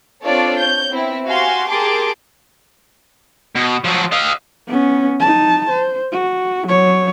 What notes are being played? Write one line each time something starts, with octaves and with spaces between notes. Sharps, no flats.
C4 D4 F4 A4 C#5 D5
C#5 G6
B3 C4 E4
F#4 G4 F5 G#5 C6
G4 G#4 A#4 A5 C6 D6
B2
F3 F#3
D#5 F5
B3 C#4
D#4 A5
C5
F#4
F#3 C#5